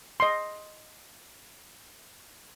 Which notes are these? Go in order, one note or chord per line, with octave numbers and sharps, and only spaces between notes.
D#5 C6